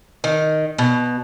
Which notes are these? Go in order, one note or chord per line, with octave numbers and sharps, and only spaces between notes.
D#3
B2